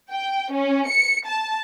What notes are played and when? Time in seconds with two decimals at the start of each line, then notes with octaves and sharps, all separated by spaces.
0.11 G5
0.52 C#4
0.88 C#7
1.26 A5